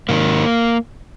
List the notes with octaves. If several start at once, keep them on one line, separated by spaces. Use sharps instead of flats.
G#2 D#3 A#3